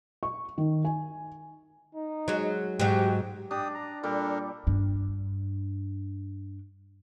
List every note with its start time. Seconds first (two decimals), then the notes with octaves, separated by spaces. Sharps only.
0.23 C#6
0.58 D#3
0.85 G#5
1.95 D#4
2.28 F#3 G#3
2.79 G#2 F#3 G4
3.51 D4 G4 D#6
3.74 A#5
4.03 A#2 G3 D4 A4 A#4 D6
4.67 G2 D4